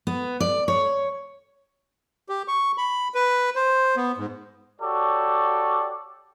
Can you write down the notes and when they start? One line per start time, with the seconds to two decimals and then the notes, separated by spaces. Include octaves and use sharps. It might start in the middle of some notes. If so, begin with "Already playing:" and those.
0.07 B3
0.40 D5
0.68 C#5
2.29 G4
2.48 C#6
2.78 B5
3.14 B4
3.56 C5
3.97 B3
4.18 G#2
4.80 F#4 G4 A4 C#5 D5